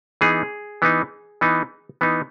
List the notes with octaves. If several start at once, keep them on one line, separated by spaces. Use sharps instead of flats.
E3 B3 D#4 G#4
E3 B3 D#4
E3 B3 D#4
E3 B3 D#4